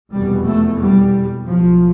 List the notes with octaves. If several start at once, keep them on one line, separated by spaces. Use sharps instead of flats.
F1 E2 B2 G3
A3
G3
B1 A2 F3